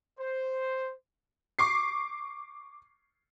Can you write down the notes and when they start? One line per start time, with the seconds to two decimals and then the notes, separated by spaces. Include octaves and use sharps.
0.20 C5
1.59 C#6 D6 C7